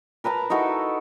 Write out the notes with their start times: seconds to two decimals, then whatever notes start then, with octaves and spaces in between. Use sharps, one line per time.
0.24 A#4 B4 A5 A#5
0.50 D#4 E4 F#4 A4